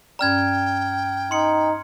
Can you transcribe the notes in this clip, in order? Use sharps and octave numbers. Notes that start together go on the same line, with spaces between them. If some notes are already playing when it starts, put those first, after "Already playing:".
G2 C#4 D5 G5 A#5 F6 G#6
D#4 C6 C#7